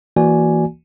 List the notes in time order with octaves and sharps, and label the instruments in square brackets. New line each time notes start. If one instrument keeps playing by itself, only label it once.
[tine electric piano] E3 A#3 F#4 D5 G#5